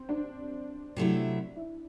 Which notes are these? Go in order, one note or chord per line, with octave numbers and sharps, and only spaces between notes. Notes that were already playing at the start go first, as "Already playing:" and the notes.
Already playing: C4
D4
C3 F#3 A3 E4
E4